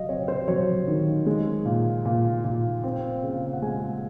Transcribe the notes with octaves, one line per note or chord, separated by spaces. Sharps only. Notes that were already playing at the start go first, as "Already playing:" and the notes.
Already playing: F#3 D#5 F5
C4 C#5
C5
F#3 C#5
D#3
G#3
A#2
A#2
A#2
C4
C#3
F#5
G#3 G#5